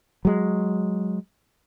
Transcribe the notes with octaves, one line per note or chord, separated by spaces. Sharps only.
F#3 G#3